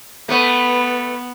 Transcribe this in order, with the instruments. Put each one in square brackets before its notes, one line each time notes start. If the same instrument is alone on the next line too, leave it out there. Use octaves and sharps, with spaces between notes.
[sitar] A3 B4 [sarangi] B3